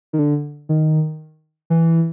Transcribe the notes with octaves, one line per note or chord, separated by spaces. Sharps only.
D#3
D3
D#3
E3